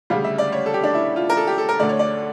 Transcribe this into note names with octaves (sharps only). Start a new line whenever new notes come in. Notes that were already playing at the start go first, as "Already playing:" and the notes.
D2 C#3 G3 F5
E5
D5
C#5
A4
G4
D4
E4
F4
A#4
A4
G4
A4
A#4
D2 D3 A3 D5
C#5
D5